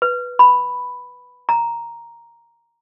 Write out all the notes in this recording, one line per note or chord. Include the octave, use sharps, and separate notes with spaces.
B4
B5
A#5